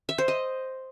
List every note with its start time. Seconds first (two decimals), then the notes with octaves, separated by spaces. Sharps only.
0.09 E5
0.18 C5
0.28 D#5